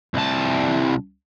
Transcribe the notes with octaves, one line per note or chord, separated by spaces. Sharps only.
C2 A5